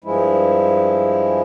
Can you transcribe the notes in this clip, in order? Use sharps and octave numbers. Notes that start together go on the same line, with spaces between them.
G2 F3 G#3 E4